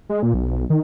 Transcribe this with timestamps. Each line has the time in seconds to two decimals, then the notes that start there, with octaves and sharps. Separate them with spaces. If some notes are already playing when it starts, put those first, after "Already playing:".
0.10 G#3
0.23 A#2
0.34 B1
0.70 D#3